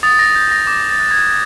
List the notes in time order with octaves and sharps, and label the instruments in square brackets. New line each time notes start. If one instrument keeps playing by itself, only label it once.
[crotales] D#6 A6
A#6
G6
A#6
D6 A#6
A6
F#6
G#6